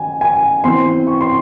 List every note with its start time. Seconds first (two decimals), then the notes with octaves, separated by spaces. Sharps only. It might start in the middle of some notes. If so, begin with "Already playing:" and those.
Already playing: D#3 G#5
0.21 G#5
0.64 C3 E3 C4 C6
1.07 C#6
1.21 C6